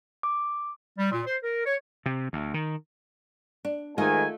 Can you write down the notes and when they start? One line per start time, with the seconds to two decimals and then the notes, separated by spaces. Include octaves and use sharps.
0.23 D6
0.97 G3
1.12 A#2
1.26 C5
1.43 A#4
1.65 C#5
2.06 C3
2.33 D2
2.54 D#3
3.65 D4
3.98 G#2 D#3 A3 F4 D#5 G#5